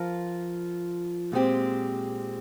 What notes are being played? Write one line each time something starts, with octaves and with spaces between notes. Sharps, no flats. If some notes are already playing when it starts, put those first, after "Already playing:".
Already playing: F3 F4 A#4
A#2 G#3 C4 G4